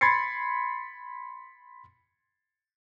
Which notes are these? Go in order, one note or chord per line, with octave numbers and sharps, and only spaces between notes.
B5 C6 G#6 A6 C7 C#7